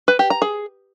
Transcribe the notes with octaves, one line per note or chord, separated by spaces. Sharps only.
B4
G4
A#5
G#4